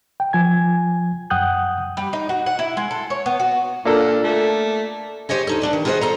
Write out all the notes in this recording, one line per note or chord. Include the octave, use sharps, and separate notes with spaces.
G5
F3 G#5 G#6
F#2 F#5 G5 D#6 F#6 G6
G3
D#4
F#4
F#5
E4
G#3
A4
C#5
B3
F#4
A#2 A#3 D4 A4
A3
G4 C5 C#5 D#5 G#5
D2 D#4 A4
A3 D4 D5
D#3
F4 F#4 G#4 A4 C5 D#5
A4 C5 A#5